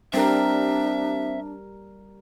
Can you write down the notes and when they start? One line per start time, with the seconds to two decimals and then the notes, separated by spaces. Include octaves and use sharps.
0.14 G3 C4 D4 A#4 E5